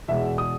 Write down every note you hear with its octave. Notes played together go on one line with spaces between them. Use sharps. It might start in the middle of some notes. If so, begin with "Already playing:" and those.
E2 B2 G#3 B3 E5
D#6